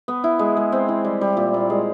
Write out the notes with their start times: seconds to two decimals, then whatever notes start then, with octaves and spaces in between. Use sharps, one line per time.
0.08 B3
0.24 E4
0.39 G#3
0.57 G#3
0.72 C4
0.89 E3
1.05 G3
1.21 G3
1.37 A#2
1.54 A#2
1.70 G#3